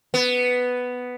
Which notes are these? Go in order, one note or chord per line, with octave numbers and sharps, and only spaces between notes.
B3